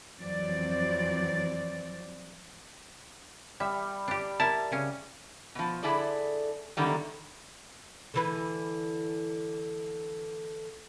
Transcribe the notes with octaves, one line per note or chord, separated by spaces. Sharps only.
F2 E3 F#3 C4 D5
G3 E5
D4 G4
E4 A#4 A5
C#3 C#4
B2 F3
D3 E4 G#4 A4 D5
E2 G#2 D3 D#3 G3
D3 E3 B4